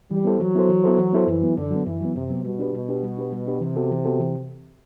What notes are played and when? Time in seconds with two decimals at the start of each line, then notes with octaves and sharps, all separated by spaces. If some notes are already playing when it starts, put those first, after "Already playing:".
0.11 E3 G3
0.25 B3 E4 A4 C5
0.40 E3 F#3
0.55 B3 E4 A4 C5
0.69 E3
0.84 B3 E4 A4 C5
0.98 E3
1.13 B3 E4 A4 C5
1.27 F#2 E3
1.42 F#3 B3
1.57 F#2 D3
1.71 F#3 B3
1.86 F#2 E3
2.01 F#3 B3
2.15 F#2 C3
2.30 F#3 B3
2.44 B2 G3
2.59 D4 G4 B4
2.73 B2 G3
2.88 D4 G4 B4
3.03 G3
3.17 D4 G4 B4
3.32 G3
3.47 D4 G4 B4
3.61 C3 E3
3.76 B3 F#4 A4
3.91 E3
4.05 B3 F#4 A4
4.20 E3